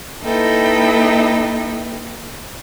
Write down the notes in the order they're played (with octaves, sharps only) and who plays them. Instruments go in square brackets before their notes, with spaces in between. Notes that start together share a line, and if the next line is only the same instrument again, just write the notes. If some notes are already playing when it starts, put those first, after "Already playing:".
[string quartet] A#3 D#4 E4 A4 B4 G5